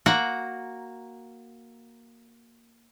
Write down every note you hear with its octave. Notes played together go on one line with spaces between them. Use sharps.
A#3 F#4 F#5 A#5